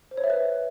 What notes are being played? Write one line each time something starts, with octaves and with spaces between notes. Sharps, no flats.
C5
C#5
E5
B4